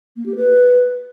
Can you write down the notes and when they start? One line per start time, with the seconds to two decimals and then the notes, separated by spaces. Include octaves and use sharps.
0.16 A#3
0.26 G4
0.35 B4